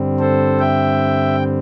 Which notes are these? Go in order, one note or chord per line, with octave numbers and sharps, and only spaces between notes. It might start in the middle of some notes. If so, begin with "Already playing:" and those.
Already playing: G2 D3 G3 C4
A4 C5
E5 G5